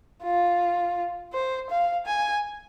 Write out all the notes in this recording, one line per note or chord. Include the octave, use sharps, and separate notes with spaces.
F4
C5
F5
G#5